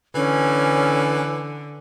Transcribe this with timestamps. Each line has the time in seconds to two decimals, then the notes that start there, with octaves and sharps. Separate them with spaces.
0.15 D3 E3 C#4